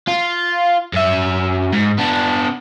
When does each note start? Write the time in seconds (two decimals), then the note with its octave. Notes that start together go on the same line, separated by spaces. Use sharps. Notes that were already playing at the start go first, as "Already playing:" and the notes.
0.07 F4
0.94 F#2 E5
1.72 G#2
1.98 B3 D4